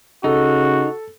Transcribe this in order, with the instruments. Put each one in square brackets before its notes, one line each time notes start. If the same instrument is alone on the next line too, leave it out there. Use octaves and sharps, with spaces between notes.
[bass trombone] C#3 [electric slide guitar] D#4 [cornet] F#4 [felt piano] A4